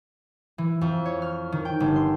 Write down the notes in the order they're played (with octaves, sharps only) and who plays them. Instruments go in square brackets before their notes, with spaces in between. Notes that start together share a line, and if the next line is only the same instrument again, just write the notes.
[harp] E3
F2
C#5
F6
D#3
G5
G1
C6